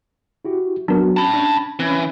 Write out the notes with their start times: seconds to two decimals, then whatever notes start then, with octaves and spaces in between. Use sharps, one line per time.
0.45 E4 F#4 G4
0.88 F#3 B3 D4 F#4 A#4
1.17 C#4 A5 B5
1.34 D4
1.79 E3 C4 C#4